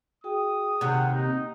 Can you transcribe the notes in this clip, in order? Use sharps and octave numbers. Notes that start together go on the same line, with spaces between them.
F#4 G#4 G5 D#6
D#2 C3 A#3 F#5
D#4